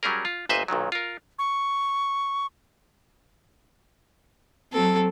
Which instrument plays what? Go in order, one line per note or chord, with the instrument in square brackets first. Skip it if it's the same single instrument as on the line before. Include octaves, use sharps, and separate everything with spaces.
[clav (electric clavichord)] F#3 G3 C#4 G#4 A#4
F4
G1 A#2 B4 C5 D#5 E5
B1 A#2 D#3 F#3
F4 A#4
[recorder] C#6
[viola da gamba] F#3 C4 [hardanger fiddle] A4